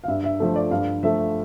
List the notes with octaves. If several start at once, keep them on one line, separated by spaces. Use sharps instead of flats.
F5
G2 E5
E5
F3 A3
D5
G2 F5
F3 A3 E5